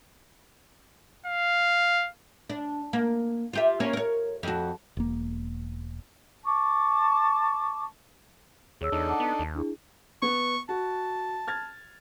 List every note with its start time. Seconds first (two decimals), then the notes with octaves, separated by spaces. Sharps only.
1.26 F5
2.50 D4
2.93 A#3
3.53 F4 G4 E5
3.80 A#3 C#4 C#5
3.93 A#4 C#5
4.43 F2 F#4
4.97 E1 A#3
6.44 A5 C#6 D6
8.81 D#2 G#4 C#5 E6
8.92 E2 D4 D#4 A4
9.08 F#5 A5 D6
9.20 B3 A5
9.39 D#2
9.55 D4 E4 G#4
10.22 B3 C#6
10.69 F#4 A5
11.47 F6 G#6 A6